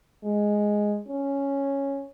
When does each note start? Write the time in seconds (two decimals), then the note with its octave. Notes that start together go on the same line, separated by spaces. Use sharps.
0.24 G#3
1.08 C#4